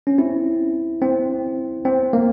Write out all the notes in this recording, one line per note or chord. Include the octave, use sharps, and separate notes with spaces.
C#4
C4 E4
C4
C4
A#3